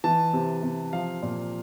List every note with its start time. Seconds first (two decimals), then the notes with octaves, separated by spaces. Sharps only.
0.04 E3 A5
0.33 C3
0.63 C3
0.93 F3 F5
1.22 A#2